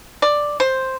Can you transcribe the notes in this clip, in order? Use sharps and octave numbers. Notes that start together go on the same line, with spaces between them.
D5
C5